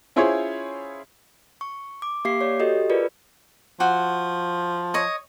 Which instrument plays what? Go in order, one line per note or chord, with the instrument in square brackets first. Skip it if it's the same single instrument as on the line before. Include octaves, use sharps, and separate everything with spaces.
[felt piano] C#4 E4 F4 G#4 C5 C#5
[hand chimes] C#6
D6
A#3 G4 F5 D6 C7
C#5 D5
F#4 G4 A4 D#5
F4 G#4 A#4 B4 D5
[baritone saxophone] F3 [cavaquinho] F#4
[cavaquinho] C#5 D#5